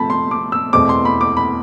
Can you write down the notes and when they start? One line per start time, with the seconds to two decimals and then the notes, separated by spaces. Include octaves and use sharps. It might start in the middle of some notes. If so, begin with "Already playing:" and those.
Already playing: C3 F3 A3 C4 A5 B5
0.10 C6
0.31 D6
0.52 E6
0.73 E2 B2 A3 C4 D6
0.89 C6
1.05 B5
1.21 D6
1.37 B5